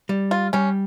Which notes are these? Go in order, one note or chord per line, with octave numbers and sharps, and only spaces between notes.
G3
F4
G3 C#4